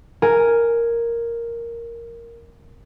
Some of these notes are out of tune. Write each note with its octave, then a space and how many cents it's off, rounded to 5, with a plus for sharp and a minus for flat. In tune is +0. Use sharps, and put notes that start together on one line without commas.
A#4 +0 G#5 +0